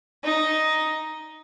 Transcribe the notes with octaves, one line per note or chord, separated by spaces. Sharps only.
D#4